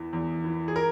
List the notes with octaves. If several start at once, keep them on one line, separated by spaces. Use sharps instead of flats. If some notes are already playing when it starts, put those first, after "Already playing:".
Already playing: E2 E3
E2
E3
G#4
A#4